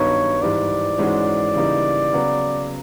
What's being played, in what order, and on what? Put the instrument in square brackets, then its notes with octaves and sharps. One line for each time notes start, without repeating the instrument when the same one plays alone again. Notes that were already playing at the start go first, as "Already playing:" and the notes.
Already playing: [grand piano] G2 D#3 F#3 B3 D#4 [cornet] C#5
[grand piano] G#2 E3 G3 [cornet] D5
[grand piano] G#2 E3 G#3 C#4 F#4
C#3 E3 G3 A#3 D#4
C#3 F#3 B3